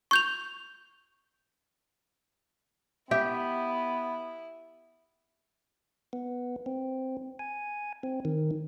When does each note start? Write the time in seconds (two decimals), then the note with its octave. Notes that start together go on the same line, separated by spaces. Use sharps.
0.11 C#6 G6 F7
3.11 B3 E4 G4 E5
6.13 B3
6.66 C4
7.39 G#5
8.03 C4
8.25 D#3